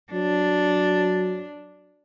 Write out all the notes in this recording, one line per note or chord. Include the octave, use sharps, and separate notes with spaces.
F#3 D4